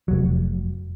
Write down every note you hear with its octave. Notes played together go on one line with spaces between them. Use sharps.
F1 F#3